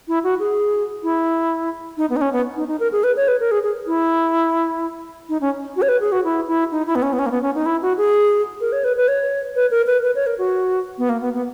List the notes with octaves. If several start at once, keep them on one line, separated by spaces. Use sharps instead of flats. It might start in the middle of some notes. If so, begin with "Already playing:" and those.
E4
F#4
G#4
E4
D#4
B3
D#4
C#4
B3
D#4
D#4
A#4
G#4
B4
C#5
B4
A#4
G#4
G#4
E4
D#4
C#4
F#4
C#5
B4
G#4
F#4
E4
E4
D#4
E4
B3
C#4
B3
C#4
A#3
B3
C#4
D#4
E4
F#4
G#4
A#4
C#5
B4
B4
C#5
B4
A#4
B4
B4
C#5
A#4
F#4
B3
A#3
B3
B3